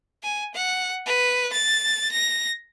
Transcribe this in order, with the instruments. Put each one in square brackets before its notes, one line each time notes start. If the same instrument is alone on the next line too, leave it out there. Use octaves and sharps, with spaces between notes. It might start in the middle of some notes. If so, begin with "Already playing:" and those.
[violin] G#5
F#5
B4
A6
A#6